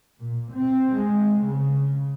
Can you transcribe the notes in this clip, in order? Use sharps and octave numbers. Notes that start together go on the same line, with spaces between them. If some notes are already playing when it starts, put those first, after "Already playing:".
A#2
C4
G#3
C#3